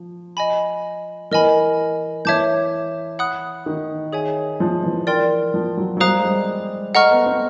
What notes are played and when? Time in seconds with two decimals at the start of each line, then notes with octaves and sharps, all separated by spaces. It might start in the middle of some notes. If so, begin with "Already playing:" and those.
Already playing: F3
0.37 D#5 G#5 B5
1.31 E3 A#4 D#5 G#5 B5
2.25 E3 C#5 E5 A5 D6 G6
3.19 F#5 B5 D#6 F#6
3.66 D#3
4.13 G#4 C#5 E5 G#5
4.60 F3
4.83 E3
5.07 A#4 D5 G5 C6
5.54 F3
5.77 F#3
5.97 F#3
6.00 G3 C5 F5 A#5 D#6 F#6
6.19 G#3
6.25 G3
6.95 A3 D#5 F#5 A#5 C#6 F6
7.11 B3
7.26 C4